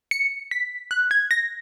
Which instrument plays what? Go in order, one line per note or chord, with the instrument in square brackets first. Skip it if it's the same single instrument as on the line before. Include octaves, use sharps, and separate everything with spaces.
[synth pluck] C#7
B6
F#6
G#6
A#6